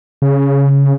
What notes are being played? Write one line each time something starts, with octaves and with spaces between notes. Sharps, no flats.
C#3